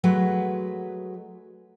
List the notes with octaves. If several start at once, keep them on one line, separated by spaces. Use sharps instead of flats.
F#3 G#3 A3 B4